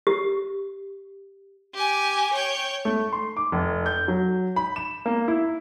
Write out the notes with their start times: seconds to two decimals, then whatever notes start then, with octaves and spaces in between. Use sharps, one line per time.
0.07 G4
1.74 G4 G#5
2.33 C#5 G5
2.85 A3
3.13 C6
3.37 D6
3.52 F1
3.86 G6
4.08 F#3
4.56 B5
4.76 E7
5.06 A#3
5.28 E4